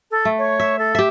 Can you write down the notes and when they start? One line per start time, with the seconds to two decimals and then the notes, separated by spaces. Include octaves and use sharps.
0.11 A4
0.25 A3
0.38 C#5
0.60 E5
0.79 A4
0.95 G4 E5